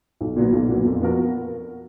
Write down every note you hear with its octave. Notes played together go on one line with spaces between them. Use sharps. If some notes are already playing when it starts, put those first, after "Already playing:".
B1
A#2 F#3 B3
B1
A#2 F#3 B3
F2
F3 B3 F#4 A#4